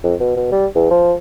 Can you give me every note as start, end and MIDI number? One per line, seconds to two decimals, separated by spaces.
0.04 0.14 41
0.20 0.34 47
0.36 0.49 47
0.52 0.66 55
0.75 0.89 40
0.91 1.14 53